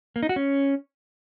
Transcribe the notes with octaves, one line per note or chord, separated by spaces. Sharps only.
A#3
D#4
F#4
C#4